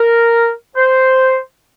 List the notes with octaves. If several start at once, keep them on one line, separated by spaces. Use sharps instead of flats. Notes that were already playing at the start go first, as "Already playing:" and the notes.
Already playing: A#4
C5